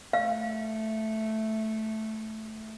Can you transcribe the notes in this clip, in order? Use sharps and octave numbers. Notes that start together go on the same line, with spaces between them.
A3 F5